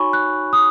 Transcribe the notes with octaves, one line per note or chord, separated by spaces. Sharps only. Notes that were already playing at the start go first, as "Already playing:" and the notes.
Already playing: D#4 F#4 C#5 G#5 B5 C#6
F#6
D#6